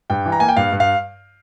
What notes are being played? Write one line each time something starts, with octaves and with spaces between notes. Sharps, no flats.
G2 G5
E3
A#5
A#3 G#5
G5
G2 F5
G2
F5